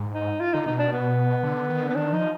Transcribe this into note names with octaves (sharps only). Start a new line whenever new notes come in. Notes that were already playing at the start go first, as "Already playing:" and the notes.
Already playing: G#2
D#4
F4
D3 D#4
B2 D#4
D4
B3
D3
D#3
D3 B3
D#3 D4
F3 D#4